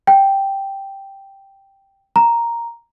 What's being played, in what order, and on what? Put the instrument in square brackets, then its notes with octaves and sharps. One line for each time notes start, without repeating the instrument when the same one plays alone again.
[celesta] G5
A#5